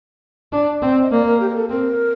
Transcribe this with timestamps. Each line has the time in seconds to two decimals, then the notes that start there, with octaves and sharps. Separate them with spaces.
0.52 D4
0.82 C4
1.02 D#5
1.11 A#3 D5
1.26 A#4
1.40 G4
1.49 A#4
1.56 A4
1.69 C4 A#4